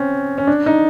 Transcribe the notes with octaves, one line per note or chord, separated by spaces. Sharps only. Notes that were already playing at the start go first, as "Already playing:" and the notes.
Already playing: C4 C#4
C#4
D4
D#4